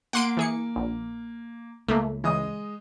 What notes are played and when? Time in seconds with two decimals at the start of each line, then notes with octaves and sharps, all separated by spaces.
0.13 A#3 F#5 C6 D7
0.37 E3 G#4 C#7
0.76 A#1
1.88 C#2 A3 A#3
2.24 C#3 E3 G#3 D#5 D#6